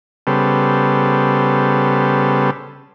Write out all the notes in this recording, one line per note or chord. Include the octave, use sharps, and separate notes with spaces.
C#3 G3 B3 A4 C5